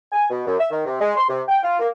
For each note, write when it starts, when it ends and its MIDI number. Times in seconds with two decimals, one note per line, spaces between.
0.12 0.25 80
0.30 0.43 47
0.46 0.56 42
0.59 0.67 76
0.70 0.84 51
0.86 0.97 48
1.00 1.14 56
1.16 1.28 84
1.28 1.41 48
1.48 1.62 79
1.63 1.78 65
1.79 1.87 58